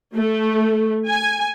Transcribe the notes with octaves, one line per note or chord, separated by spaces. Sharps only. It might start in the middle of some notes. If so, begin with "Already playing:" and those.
A3
G#5